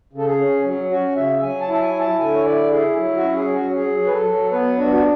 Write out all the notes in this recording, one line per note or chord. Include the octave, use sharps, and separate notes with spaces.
C#3 A4
G#4
C#4
F#3
C#4 F#4
C#3 E5
F#3 G#5
A5
E4
A5
G#5
E4
A5
D3 G#5
C#5
E4 D5
E4 G#4
F#3
F#4
C#4
G#4
F#3
F#4
F#3 G#4
F#3
B4
A4
F#3
B3 B4
D4 F#4
F#4